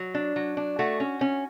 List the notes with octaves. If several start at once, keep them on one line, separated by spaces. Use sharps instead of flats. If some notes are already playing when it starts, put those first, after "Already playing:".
Already playing: F#3
D4
F#3
D4
A3 F#4
C#4
C#4